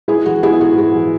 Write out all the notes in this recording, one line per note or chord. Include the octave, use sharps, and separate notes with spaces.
G#3 E4 G#4
E3 F#4
B3 E4 G#4
G#2 F#4
G#3 F#4
E3